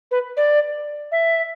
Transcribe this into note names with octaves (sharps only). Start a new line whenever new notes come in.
B4
D5
E5